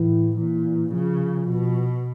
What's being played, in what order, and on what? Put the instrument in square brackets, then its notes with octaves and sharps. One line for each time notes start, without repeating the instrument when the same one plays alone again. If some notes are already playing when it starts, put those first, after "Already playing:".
Already playing: [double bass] A2 [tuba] E3
[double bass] A#2 [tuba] E3
[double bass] C#3 [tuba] F3
[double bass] B2